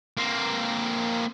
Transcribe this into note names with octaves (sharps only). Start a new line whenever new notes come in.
A#3 C4